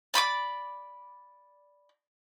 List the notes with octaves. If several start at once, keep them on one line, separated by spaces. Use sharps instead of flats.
D5 B5 C6 D6